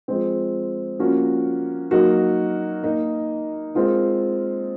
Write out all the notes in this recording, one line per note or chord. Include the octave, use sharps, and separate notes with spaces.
F3 G#3 C4
F3 A#3 C#4 F#4 A#4
F#3 A#3 D#4 F#4 A#4
A#3 D#4 A#4 D#5
G#3 C4 F4 A#4